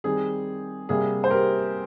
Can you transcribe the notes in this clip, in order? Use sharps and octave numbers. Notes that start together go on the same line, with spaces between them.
D#3 G3 C4 G#4
C3 G3 A#3 G#4
C5
G4 A#4